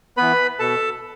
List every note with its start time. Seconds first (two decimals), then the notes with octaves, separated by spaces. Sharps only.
0.17 E3 B3 B4 B5
0.59 B2 A4 A5